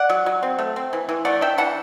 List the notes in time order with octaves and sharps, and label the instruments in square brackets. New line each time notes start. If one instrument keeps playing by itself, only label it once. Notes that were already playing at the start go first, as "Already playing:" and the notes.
Already playing: [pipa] D5 F#5
F#3
F#3
C4
A3
C4
E3
E3
A3 D5 F#5
D4 E5 G5
E3 F#5 A5